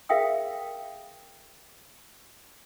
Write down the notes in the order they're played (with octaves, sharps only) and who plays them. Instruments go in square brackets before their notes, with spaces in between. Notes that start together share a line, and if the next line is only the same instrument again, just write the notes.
[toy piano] G#4 A#4 E5 F5 G5 D#6